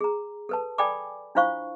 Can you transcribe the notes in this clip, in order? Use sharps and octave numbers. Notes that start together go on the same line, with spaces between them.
G#4 A#5
A4 B4 A5
A4 D5 G5 G#5 B5 D6
D4 E4 F4 C5 F5 C#6